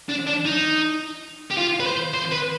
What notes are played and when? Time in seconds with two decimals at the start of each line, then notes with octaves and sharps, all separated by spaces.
0.09 D4
0.26 D4
0.45 D#4
1.51 G4
1.57 F4
1.80 B4
1.86 C5
2.14 C5
2.32 B4